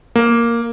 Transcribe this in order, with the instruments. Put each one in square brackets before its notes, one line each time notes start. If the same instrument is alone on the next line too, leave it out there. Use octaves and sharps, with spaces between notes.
[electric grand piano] A#3